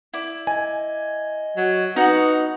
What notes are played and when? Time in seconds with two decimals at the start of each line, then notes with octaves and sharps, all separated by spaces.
0.13 E4 D5
0.47 D#5 G#5
1.57 F#3
1.96 B3 D#4 F#4 D#6